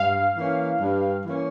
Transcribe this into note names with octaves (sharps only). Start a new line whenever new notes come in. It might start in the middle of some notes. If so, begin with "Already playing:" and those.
Already playing: G2 F5
E3 A#3 C#4
G2
E3 A#3 C#4